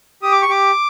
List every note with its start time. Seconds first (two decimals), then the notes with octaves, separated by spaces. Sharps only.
0.22 G4 D#6
0.32 D6
0.42 C#6
0.48 G4 D6